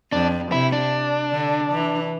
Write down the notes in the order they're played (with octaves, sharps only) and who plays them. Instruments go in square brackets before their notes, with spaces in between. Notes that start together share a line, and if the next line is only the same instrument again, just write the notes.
[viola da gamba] F2 [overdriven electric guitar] D4
[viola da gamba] C3 [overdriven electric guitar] E4
[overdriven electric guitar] D4
[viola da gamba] D3
E3